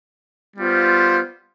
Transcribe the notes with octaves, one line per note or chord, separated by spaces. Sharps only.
G3 B3 F4 C5